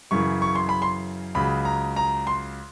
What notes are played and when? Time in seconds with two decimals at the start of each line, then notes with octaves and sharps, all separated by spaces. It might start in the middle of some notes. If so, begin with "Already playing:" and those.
0.11 F#2 C#3 E3 C#6
0.42 C#6
0.55 C6
0.69 B5
0.82 C6
1.35 C#2 C#3 F#3 B5
1.65 A#5
1.96 A#5
2.27 C6